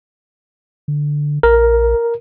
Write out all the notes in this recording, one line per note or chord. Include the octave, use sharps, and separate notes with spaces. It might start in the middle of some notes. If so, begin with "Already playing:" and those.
D3
A#1 A#4